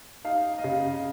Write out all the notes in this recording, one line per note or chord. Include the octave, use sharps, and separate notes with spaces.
D#4 F5
D#5
C#3 F5